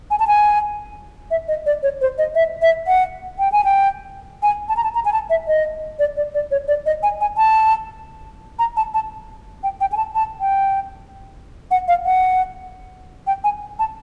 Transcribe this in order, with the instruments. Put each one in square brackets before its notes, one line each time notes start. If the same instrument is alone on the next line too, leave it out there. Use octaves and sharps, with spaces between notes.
[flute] G#5
A5
G#5
E5
D#5
D5
C#5
C5
D#5
E5
E5
F#5
G5
G#5
G5
G#5
A5
A#5
A5
A#5
G#5
A5
E5
D#5
D5
D5
D5
C#5
D5
D#5
G#5
G#5
A5
A#5
A5
A5
G5
G5
G#5
A5
A5
G5
F#5
F5
F#5
G5
G#5
A5